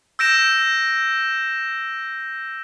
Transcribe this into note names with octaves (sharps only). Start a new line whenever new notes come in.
E6 G6 A#6 D7 E7